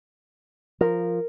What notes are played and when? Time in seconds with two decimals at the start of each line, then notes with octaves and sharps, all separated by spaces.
0.81 F3 A#4